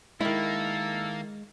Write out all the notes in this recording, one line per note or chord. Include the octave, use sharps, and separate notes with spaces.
D#3 G#3 A#3 E4 A4